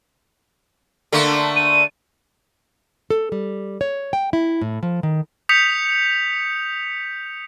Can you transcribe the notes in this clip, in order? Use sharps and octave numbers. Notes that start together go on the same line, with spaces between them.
D3 A3 A#3
D#7
A4
G3
C#5
G5
E4
A2
F3
D#3
D#6 G6 B6 C#7 F7